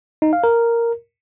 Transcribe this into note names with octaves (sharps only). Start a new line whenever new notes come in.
D#4
F5
A#4